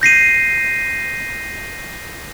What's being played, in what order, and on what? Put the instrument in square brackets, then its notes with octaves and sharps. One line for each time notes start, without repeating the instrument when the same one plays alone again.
[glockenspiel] G6 A#6 C7 D#7